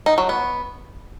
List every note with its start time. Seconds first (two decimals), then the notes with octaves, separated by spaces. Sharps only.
0.06 D#4
0.18 F#3
0.29 B3